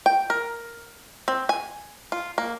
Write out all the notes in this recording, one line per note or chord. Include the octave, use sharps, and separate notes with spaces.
G5
A#4
C4
G#5
F4
A#3